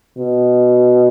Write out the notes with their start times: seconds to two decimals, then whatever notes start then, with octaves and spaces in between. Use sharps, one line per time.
0.18 B2